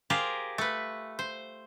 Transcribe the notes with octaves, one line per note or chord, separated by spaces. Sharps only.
F4 G4 G#4 A#4 C5
A3 B4
C5